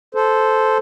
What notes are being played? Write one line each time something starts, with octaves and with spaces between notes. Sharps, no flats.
A4 C5